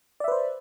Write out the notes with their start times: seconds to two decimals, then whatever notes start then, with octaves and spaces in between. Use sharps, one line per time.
0.20 D5
0.24 E5
0.28 B4
0.32 C5